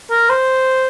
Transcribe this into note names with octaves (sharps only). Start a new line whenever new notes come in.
A#4
C5